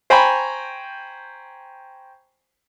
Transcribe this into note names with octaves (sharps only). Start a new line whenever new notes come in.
C5 G5 G#5 A#5 B5 C#6